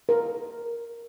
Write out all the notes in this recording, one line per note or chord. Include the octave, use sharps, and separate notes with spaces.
A#4